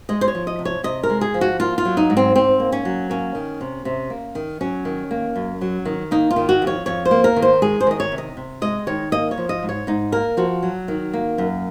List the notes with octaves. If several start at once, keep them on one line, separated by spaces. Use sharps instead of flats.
G#3 D#5
C5
C#5
F3
D#5
C3
C#5
C3 D#5
A#4
G#3
G#4
F3
F#4
A#3 F4
F4
F#3
D#4
G#2
C4
G#2 C4
A#3
C#4
F#3
A#3 C#4
D#3
C3
C3
A#3
D#3
F#3 C#4
D#3
A#3
F#2
F#3
D#3
A#3 D#4
F4
D#3
F#4
F2
C#5
F2 C#5
C5
A#3
A#4
D#3
C5
G#3 G#4
C5
D#3 D#5
C#5
C3
D#5
C3
G#3 D#5
D#3 C#5
A#3 D#5
C#5
F3
D#5
G#2
C#5
G#2 D#4
A#3 A#4
F3 F#4
F#3
D#3
A#3
F#2